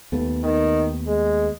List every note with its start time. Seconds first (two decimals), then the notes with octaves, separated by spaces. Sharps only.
0.12 D#2 A3 B3
0.44 D#3
1.07 G#3